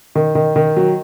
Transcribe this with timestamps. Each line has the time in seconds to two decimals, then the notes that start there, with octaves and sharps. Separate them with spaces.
0.15 D#3
0.35 D#3
0.56 D#3
0.77 F#3